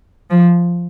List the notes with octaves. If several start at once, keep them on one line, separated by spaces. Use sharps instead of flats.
F3